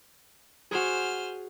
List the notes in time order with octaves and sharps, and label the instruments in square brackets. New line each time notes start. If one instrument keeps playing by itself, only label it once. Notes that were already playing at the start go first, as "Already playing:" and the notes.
[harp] F#4 G#4 [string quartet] C5 G#5 F6